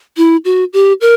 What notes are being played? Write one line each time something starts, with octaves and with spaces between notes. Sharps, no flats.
E4
F#4
G4
A#4